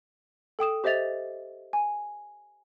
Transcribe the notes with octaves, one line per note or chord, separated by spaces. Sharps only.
A4 G5 D#6 E7
G4 C5 D#5 E5 A6 F7
G#5